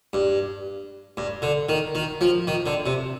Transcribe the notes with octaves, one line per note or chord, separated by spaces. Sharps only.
G2
G2
D3
D#3
D#3
F3
D#3
D3
C3